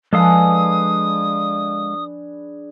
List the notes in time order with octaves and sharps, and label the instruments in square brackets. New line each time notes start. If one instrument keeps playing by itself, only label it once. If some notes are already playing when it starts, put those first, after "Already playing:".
[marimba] F3 [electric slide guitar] G#3 A4 F5 [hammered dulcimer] D4 G#4 B4 [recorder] D#6